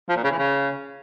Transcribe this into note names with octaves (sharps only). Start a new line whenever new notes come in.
F3
A#2
C#3
E3
C#3